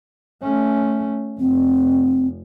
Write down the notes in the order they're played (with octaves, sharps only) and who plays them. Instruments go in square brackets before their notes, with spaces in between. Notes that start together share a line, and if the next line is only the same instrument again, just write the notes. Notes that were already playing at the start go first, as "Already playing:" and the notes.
[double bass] A3 C#4
[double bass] F1 [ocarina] C4